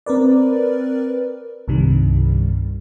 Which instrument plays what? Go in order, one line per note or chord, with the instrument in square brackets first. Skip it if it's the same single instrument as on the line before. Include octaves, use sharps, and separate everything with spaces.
[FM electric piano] C4 A#4 B4 D5
C2 G2 C3 D#3 G3